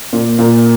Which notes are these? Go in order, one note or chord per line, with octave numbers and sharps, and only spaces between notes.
A#2
A#2